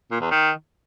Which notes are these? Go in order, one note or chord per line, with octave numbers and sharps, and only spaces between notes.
A#2
E2
D#3